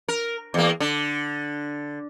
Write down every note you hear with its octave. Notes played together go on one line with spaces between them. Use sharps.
A#4
E2 A#3
D3